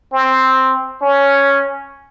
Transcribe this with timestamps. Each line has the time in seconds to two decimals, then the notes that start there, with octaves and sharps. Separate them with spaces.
0.13 C4
1.02 C#4